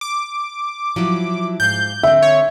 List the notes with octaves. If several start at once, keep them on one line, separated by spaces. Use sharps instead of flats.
D6
F3 F#3 E4
G#2 F5 G6
D3 C4 E5
C#5